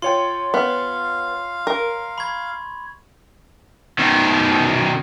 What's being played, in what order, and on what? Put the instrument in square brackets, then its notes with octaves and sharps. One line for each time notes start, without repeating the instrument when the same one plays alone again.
[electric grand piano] F4 C#5 G5 [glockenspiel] C6
[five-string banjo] B3 [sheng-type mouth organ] F5
[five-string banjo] A#4
[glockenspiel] B5 C#6 G#6
[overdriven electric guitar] B2 D#3